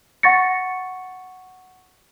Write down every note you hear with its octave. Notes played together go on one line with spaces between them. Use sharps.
F#5 C#6 A6 A#6 C#7